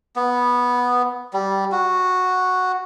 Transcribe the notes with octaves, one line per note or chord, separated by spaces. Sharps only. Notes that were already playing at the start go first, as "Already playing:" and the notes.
B3
G3
F#4